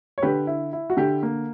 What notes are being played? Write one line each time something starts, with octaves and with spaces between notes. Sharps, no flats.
C#5
D3 G4 B4
E4
E4
F#4
D3 G4
A#3